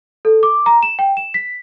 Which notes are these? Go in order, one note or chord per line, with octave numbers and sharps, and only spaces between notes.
A4
D6
A#5
E7
G5
E7
B6